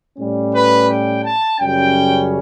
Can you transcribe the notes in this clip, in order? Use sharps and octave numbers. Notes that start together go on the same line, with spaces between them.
A2 G3 C#4
B4
G5
A5
F#2 C#3 G3 C#4 G5